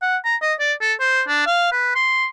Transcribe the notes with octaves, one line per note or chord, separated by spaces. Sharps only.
F#5
A#5
D#5
D5
A4
C5
D4
F5
B4
C6